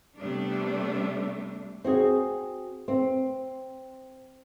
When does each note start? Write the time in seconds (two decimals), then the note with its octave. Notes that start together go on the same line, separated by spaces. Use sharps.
0.17 C3 G3 A3 B3 D4
1.84 C4 F#4 G#4
2.88 C4